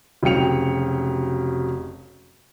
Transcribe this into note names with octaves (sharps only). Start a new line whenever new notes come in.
F1 C#3 F#3 G5 C#7 F7